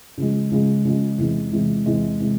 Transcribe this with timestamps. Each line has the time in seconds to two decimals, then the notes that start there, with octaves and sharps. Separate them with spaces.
0.18 C#3 F3 G#3
0.52 C#3 F3 G#3
0.85 C#3 F3 G#3
1.18 E2 C3 E3 G#3
1.52 E2 C3 E3 G#3
1.86 E2 C3 E3 G#3
2.20 C3 E3 G#3